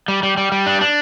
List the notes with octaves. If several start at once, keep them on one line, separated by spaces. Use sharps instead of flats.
G3
G3
G3
G3
D4
D4